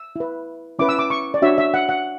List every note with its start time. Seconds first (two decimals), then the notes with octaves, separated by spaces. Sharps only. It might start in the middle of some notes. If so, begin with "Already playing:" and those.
Already playing: E6
0.16 E4 B4
0.79 C#4 E4 B4 D6
0.89 E6
0.99 D6
1.10 C#6
1.34 D5
1.42 D4 F#4 C#5 E5
1.58 E5
1.74 F#5
1.89 F#5